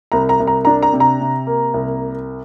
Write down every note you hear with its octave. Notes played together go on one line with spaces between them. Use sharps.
C2 A#5
A#5
C2
A#5
D4 A#5
A#5
C3
A#5
C3
A#3
C2